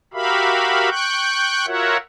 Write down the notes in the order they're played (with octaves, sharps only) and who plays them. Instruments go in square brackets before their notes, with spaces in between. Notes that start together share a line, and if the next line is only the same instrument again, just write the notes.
[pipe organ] F#4 G4 A#4 E5 F5 B5
G5 C#6 F#6 G6
F4 F#4 A#4 C#5 E5 F#5